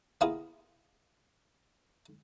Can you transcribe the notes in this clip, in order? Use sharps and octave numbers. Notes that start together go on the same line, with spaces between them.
A#3 B3 E4 F4 G#4